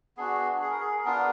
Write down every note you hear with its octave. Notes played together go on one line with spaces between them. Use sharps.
B3 D4 F#4 G#4
G#4
A#4
G#4
G#4
B3 D4 F4 A#4